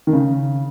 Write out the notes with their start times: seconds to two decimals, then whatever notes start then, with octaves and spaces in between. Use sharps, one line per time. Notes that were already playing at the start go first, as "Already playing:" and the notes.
0.07 D#3
0.13 C#3